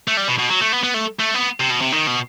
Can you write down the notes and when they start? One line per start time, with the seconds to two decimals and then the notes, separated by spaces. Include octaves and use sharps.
0.08 A3
0.17 G3
0.28 B2
0.38 B2
0.49 F#3
0.61 A3
0.72 B3
0.83 B3
0.94 A3
1.19 A3
1.34 B3
1.60 C3
1.70 B2
1.81 C3
1.92 D#3
2.07 B2